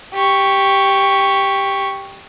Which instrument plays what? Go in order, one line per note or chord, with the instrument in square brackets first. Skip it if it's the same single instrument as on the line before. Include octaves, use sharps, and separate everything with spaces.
[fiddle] G4 C#6